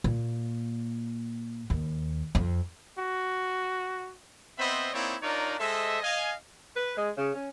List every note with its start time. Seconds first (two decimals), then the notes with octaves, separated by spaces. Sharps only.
0.04 A#2
1.70 D#2
2.35 F2
2.98 F#4
4.58 B3 C4 C5 D#5 E5 B5
4.93 A#3 C4 D#4 E4 C#5 D5
5.23 D4 D#4 F4 A#4 C#5 D5
5.59 G#3 A4 C5 D#5 E5
6.02 D#5 F5 G#5
6.76 B4
6.96 G#3
7.17 C#3
7.35 C#4